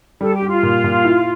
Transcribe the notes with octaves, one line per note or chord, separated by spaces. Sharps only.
G3 A4
G4
G3
F4
A#2
A#2
E4